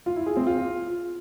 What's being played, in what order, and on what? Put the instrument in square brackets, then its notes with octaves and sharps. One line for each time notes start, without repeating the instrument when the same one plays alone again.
[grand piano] F4
E4
G#4
C4
F4